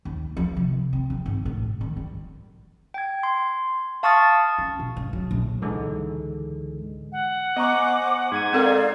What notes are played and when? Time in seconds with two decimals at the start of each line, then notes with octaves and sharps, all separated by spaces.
0.05 D#2
0.37 F3
0.57 C3
0.93 C4
1.10 D3
1.26 G#1
1.45 A2
1.81 D#3
1.96 G3
2.94 G5 G#6
3.23 C6
4.03 F5 A5 C#6 D#6 F6 A6
4.58 C#4
4.79 B2
4.97 G2
5.13 F#3
5.31 A#1
5.62 C#2 G#2 D3 E3 G#3
7.12 F#5
7.57 B3 C5 D#5 G#5 A#5 C#6 D6
8.32 G#2 F#5 G#6 D#7
8.53 C4 D#4 A4 A#4 D5 F5